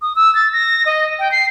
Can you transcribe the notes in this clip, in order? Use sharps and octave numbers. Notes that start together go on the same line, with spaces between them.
D#6
E6
A6
A#6
D#5
G5
C7